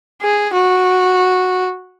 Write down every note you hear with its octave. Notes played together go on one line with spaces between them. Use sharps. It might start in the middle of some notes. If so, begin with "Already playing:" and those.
G#4
F#4